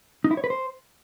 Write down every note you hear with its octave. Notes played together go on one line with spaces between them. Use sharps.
D#4
E4
C#5
B4
C5